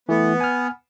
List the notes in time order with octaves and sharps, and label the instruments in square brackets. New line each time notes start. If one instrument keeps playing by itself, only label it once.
[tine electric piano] E3 A3 [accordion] B3
[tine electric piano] G#5 F6